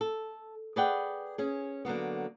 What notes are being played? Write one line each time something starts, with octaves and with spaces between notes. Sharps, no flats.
A4
G#4 B4 D5 F#5 G5
C#4 G#4
D3 F#3 A#3 B3